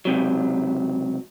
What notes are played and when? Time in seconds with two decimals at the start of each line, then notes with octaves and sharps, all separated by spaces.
0.05 C#2 C3 F#3